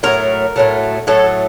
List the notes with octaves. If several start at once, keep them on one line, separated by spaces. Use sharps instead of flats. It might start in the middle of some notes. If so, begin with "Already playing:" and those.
A2 F#3 A3 A#4
A2 F#3 A3
A2 F#3 A3 A4